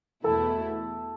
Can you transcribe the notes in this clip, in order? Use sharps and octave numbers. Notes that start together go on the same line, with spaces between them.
E2 B2 A3 E4 A4